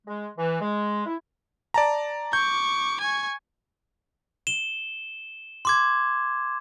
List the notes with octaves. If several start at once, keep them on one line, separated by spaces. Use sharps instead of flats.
G#3
E3
G#3
E4
D5 A5 A#5
C#6 D6 G6
G#5 C#6
E7 G7
C6 D6 G#6